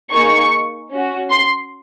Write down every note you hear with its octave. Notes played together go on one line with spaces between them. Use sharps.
A#3 D#4 G#4 C#6
C#4 F#4
C6